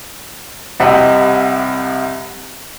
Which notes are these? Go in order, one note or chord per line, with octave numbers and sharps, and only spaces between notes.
C2 C3 G4 D#5 E5 F#5